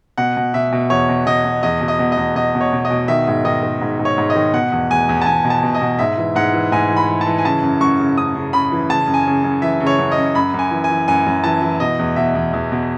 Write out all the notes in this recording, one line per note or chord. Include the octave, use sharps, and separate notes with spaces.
B2 F#5
B2
B2 E5
B2
E2 C#5
B2
B2 D#5
B2
E2 D#5
B2
D#5
B2
D#5
E2
B2 D#5
B2
C#5
B2
D#5
B2
D#3 E5
G#2
D#3 D#5
D#3
G#2
G#2
C#5
G#2
D#5
D#3
B2 F#5
E2
E2 G#5
E2
A5
E2 G#5
B2
A5
B2
D#5
B2
G#2 E5
E3
G#2 F#5
E3
G#2 G#5
E3
B5
E3
A5
E3
G#5
C#3 A5
F#2
F#2 C#6
C#3
F#2 D#6
C#3
C#3 B5
E3
C#3 A5
F#2
G#5
C#3
F#2
E3 E5
C#3
C#5
F#2
D#5
F#2
F#2 B5
F#2 G#5
E3
G#5
E3
F#2 G#5
F#2
E3 A5
E3
B2 D#5
E2
B2 E5
E2
E2
B2